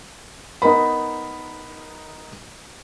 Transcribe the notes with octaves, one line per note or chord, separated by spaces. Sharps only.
B3 D#4 A#4 B5